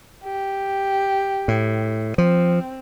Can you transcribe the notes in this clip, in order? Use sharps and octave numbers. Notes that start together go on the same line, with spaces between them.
G4
A2
F3 C4